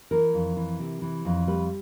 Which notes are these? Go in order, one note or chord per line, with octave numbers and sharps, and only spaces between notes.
E3 A#4
F2
E3
C3
E3
F2
G3 B4